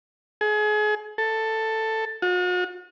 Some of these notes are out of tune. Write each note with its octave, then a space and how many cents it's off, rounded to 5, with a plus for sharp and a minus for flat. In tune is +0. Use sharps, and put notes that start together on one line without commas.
G#4 +30
A4 +10
F#4 -45